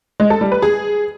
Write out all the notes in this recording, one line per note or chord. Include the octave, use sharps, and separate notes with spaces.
G#3
A4
G3
B4
G#4